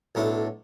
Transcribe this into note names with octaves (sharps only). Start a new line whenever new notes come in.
B1 A2 A3 D4